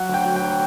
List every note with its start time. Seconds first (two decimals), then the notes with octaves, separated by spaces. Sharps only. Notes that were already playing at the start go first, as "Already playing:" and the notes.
Already playing: F#3 F#5
0.09 D2
0.14 G5
0.26 F#3
0.36 G5
0.42 D2